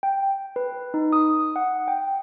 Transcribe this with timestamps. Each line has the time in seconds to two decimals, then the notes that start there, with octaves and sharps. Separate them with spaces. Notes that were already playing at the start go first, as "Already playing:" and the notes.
0.03 G5
0.56 B4
0.94 D#4
1.13 D#6
1.56 F#5
1.88 G5